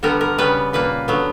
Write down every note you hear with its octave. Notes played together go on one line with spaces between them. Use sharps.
D3 G3 B3 A#4
A#4
C#3 G3 B3 B4
A#2 A#3 B4
D3 F#3 B3